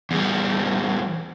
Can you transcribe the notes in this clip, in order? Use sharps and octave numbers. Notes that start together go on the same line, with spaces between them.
E2 G3